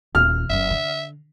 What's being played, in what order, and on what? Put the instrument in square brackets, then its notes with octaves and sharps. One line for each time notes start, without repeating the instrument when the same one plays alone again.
[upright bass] D#1 [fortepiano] F6
[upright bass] F#1 F#2 [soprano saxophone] E5
[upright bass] D3